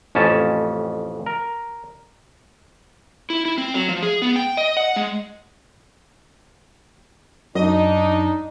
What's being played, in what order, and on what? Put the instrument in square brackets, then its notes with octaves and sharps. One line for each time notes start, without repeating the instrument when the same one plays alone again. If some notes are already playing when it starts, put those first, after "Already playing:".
[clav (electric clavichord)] A1 F2 C#4 A5
A#4
[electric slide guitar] E4
E4
C4
F#3
F3
G#4
B3
G5
D#5
F#5
G#3
[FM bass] F#2 [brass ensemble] D4 D#4 [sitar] D#5